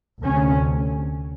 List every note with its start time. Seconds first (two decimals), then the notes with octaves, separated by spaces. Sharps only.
0.22 D2 C3 C#4